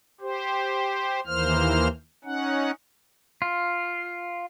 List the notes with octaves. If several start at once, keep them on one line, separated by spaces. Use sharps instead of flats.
G4 C5
D#2 E3 A#3 C5 F6
C#4 D#4 F#5
F4